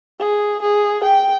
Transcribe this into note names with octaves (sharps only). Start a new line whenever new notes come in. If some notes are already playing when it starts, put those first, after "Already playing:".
G#4
G#4
G5